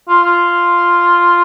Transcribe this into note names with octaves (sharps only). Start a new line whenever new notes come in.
F4
F4